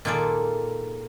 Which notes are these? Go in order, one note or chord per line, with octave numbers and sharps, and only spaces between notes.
A#2 D#3 F4 G#4 A4 D5